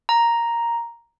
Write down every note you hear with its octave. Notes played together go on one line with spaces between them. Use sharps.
A#5